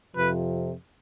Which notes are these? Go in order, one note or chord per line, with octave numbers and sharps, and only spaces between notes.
F2 C3 F3 B4